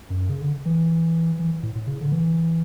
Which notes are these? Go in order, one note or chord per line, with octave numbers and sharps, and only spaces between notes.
F#2
C#3
D3
E3
E3
A2
A2
C#3
D3
E3